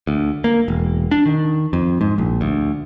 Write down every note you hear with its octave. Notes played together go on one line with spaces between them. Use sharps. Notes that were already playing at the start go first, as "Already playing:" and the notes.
D2
A#3
E1
D4
D#3
F2
G#2
A#1
D2